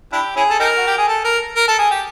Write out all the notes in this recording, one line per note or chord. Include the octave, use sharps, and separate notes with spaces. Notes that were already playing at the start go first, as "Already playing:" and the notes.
D4 E4 G4
C#4 E4 G#4
A4
D#4 G4 A#4
F#4
G4
G#4
A4
A#4
A#4
A4
G#4
G4